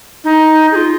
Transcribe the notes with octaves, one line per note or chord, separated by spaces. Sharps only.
D#4
G#4
F4